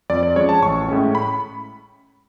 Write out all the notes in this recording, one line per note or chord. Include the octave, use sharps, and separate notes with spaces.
F2 D5
D5
F3 G#3 C#4 C#5
A5
A1 C#6
A2 G#3 C#4
B5